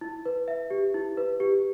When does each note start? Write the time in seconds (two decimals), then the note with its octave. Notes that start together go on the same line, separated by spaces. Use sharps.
0.01 E4
0.25 B4
0.48 E5
0.71 G4
0.94 E4
1.17 B4
1.40 G4